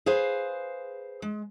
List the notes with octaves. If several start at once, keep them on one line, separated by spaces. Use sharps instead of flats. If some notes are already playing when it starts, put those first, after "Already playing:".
G#4 B4 C5 F5
G#3